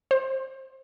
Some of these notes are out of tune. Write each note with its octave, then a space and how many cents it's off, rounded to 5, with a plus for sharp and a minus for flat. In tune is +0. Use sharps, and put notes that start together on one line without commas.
C5 +30